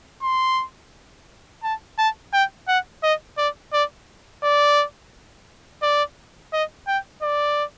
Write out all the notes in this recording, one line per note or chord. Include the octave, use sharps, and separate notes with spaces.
C6
A5
A5
G5
F#5
D#5
D5
D5
D5
D5
D#5
G5
D5